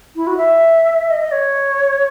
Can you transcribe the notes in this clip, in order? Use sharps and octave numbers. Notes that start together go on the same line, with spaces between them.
E4
F#4
E5
D#5
D#5
C#5